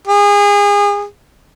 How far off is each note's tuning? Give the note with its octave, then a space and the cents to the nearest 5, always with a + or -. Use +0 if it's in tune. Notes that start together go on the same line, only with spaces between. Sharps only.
G#4 -30